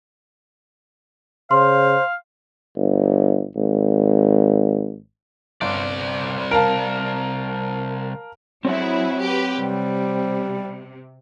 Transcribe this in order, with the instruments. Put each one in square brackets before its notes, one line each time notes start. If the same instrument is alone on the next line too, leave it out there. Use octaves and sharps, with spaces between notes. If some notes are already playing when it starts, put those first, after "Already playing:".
[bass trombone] C#3 [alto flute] C5 [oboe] F5 [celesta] C6
[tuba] G1
G#1
[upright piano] G1 [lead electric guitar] C2 D5
[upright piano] A#4 F5 A5
[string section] F#3 E4 G#4 [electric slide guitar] C4 C#5 F#5
[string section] G4 B4
[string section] C3 [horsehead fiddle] G3